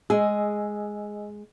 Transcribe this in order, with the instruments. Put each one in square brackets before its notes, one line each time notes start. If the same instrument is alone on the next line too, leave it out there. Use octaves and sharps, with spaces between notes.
[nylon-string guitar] G#3 G#4 [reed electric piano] D#5 G#5 E6